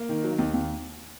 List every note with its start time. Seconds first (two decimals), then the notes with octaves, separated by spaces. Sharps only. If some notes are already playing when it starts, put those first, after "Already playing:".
Already playing: A#3
0.09 D#3
0.24 F#3
0.38 D#2
0.54 D#2